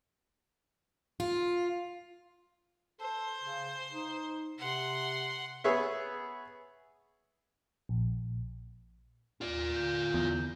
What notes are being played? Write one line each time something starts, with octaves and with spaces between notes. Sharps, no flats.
F4
A4 C5
C#3
D#4
C3 F#5 C6
B3 G#4 C#5 E5
A#1
D#2 F4 D5
D3 G6
E2